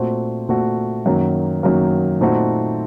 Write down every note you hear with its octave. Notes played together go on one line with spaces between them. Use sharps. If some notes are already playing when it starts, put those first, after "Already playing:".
Already playing: A#2 A3 C4 F#4
A#2 A3 C4 F#4
F#2 D#3 F#3 A#3
F#2 D#3 F#3 A#3
A#2 A3 C4 D#4 F#4